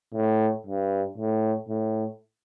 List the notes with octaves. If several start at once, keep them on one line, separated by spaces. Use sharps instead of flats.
A2
G2
A2
A2